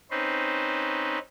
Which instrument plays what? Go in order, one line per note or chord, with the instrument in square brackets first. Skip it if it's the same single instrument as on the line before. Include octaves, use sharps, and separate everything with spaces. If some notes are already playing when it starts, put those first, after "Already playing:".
[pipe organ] C4 C#4 D#4 B4 C5